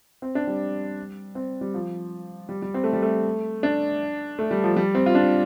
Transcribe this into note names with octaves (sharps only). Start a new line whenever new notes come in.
C4
D4
G3
C4
G3
F3
G3
G3
C4
A3
G3
A3
D4
A3
G3
F3
G3
C4
F4
D4